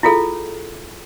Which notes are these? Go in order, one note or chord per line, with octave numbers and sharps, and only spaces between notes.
E4 F4 G#4 A4